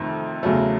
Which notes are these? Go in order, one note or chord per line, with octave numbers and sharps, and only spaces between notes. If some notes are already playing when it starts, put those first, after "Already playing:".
Already playing: F2 C3 D#3 A3
E2 C#3 F#3 A3